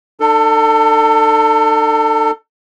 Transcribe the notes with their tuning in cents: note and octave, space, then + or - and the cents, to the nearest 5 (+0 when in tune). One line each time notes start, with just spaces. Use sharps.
D#4 -45 A4 +20